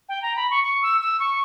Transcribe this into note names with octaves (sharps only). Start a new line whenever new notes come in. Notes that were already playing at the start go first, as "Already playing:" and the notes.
G5
A#5
B5
C#6
C#6
E6
E6
C#6